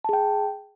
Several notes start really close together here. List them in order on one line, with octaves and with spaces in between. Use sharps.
A5 G#4 G5